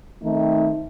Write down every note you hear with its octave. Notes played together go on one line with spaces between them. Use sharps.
D#3 A3 C4 D#4